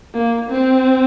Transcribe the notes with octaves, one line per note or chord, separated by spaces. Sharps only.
A#3
C4